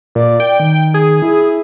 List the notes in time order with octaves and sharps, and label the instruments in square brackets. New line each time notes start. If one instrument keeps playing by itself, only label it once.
[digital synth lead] A#2 [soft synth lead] D5
[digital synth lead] G5
[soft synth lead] D#3
[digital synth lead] G#4
[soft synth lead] E4